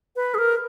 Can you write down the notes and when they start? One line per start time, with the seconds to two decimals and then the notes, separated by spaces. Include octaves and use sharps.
0.16 B4
0.34 G#4
0.38 A#4